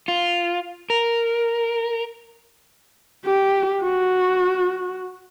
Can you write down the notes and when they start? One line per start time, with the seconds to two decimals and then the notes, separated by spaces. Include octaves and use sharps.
0.08 F4
0.90 A#4
3.25 G4
3.82 F#4